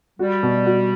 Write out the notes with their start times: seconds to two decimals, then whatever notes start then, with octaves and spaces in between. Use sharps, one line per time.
0.19 G3 F#4
0.43 B2
0.66 F#4